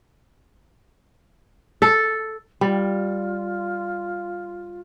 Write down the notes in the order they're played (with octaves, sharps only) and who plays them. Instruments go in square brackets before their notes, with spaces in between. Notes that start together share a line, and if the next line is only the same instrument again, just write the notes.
[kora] A4
[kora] G3 [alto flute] F4